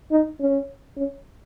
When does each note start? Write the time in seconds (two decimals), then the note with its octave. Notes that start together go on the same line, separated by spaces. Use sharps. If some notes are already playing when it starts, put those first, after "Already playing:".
0.11 D#4
0.40 C#4
0.97 C#4